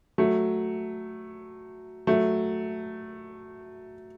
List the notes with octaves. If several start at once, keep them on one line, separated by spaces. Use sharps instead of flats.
F#3 A3
F#3 A3